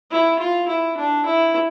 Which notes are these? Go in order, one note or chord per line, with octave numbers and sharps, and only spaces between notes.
E4
F4
E4
D4
E4